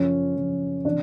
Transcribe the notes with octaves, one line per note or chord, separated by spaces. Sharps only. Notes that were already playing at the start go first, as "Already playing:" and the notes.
Already playing: F#2 C#3 F3 C#4
F#2 C#3 F3
C3 E3 D4